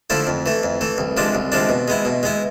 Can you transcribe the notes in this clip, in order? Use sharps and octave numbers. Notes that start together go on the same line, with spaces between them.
D3 F3 A3 E4
F2
E3 A3
F2
E3 A3
C2
C3 F3 G#3 D4
C2
C3 F3 G#3 D4
B2
G#3 B3 E4
B2
G#3 B3 E4